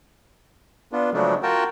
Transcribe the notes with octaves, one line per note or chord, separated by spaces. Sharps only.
B3 D4 F4
C#3 F3 F#3 G#3 A3 D4
F4 F#4 A#4 G5 A5